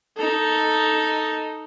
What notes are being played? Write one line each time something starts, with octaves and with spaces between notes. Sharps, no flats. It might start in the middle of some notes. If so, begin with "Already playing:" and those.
D#4 A4